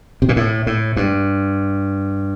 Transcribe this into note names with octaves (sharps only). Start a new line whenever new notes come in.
C3
A#2
A2
A2
G2